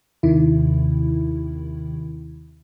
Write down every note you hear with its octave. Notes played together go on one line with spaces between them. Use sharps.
D#2 C3 D#3 E4